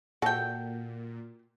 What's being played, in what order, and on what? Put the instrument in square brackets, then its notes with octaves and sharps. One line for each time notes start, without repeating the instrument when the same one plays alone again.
[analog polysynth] A#2 [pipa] F#4 G5 [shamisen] A4